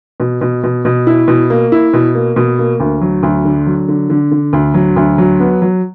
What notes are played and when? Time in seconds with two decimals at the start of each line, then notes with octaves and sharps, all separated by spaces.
0.20 B2
0.41 B2
0.64 B2
0.85 B2
1.07 E4
1.28 B2
1.50 A#3
1.72 E4
1.93 B2
2.15 A#3
2.36 B2
2.59 A#3
2.80 D2
3.01 F#3
3.23 D2
3.45 D3
3.67 F#3
3.88 D3
4.10 D3
4.31 D3
4.53 D2
4.74 F#3
4.96 D2
5.18 F#3
5.40 B3
5.62 F#3